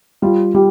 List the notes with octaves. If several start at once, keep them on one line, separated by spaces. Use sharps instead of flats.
G3 F4
G3 G4